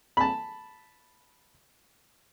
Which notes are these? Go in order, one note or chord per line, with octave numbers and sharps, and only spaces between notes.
A5 B5